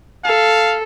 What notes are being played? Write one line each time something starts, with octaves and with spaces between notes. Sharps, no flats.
A4 F5